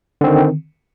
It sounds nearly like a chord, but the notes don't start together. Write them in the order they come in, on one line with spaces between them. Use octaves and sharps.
D3 C4 D#3